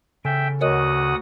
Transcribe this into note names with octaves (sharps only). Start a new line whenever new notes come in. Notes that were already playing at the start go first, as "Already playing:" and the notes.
C#3 A4 E5 G5 G#5
D2 F#4 A#4 C#5 D#5 F#5 D#6